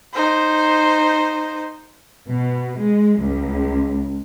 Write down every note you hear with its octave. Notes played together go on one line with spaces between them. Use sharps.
D#4 C5
B2
G#3
C#2